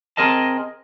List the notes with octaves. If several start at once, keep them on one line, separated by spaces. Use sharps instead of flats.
C4 G#4 A#4 D#5 A5